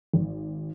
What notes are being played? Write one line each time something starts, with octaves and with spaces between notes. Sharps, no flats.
G#1